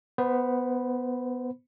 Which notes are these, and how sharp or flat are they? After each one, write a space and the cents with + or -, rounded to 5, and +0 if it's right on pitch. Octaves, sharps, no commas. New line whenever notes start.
B3 +0 C5 -25 B5 -5